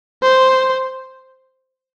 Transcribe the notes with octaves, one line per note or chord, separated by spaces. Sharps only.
C5